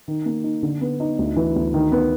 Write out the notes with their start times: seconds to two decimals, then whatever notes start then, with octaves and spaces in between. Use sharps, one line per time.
0.08 D#3
0.26 A#3
0.44 D#4
0.63 D3
0.81 B3
1.00 D#4
1.19 D2
1.36 E3
1.56 D2
1.74 D#3
1.92 B3